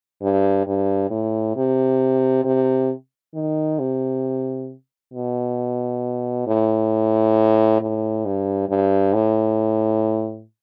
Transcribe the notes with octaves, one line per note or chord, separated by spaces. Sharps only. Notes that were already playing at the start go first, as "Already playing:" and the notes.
G2
G2
A2
C3
C3
D#3
C3
B2
A2
A2
G2
G2
A2